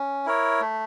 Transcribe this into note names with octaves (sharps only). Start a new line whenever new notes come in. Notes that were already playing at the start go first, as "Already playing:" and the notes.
Already playing: C#4
E4 A#4 C#5
A3